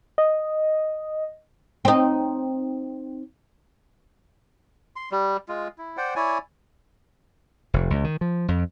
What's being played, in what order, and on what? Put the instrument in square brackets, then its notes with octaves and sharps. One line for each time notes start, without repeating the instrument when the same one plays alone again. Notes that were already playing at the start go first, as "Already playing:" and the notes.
[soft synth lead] D#5
[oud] C4 D#4
[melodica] C6
G3
G#3 F4
E4
C5 D5 F#5 G5
E4 C#5 D5 G#5
[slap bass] F1
C#2
D#3
F3
F2